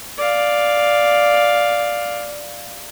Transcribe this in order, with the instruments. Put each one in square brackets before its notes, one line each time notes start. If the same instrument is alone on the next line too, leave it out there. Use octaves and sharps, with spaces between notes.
[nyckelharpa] D5 F5